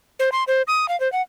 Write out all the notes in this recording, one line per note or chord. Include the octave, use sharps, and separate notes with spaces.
C5
C6
C5
D#6
F5
C5
F#5